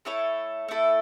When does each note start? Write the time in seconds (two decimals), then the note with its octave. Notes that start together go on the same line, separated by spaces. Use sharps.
0.05 A3 E4 A4 C#5
0.68 A3 E4 A4